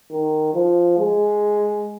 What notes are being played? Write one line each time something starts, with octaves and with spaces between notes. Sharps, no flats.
D#3
F3
G#3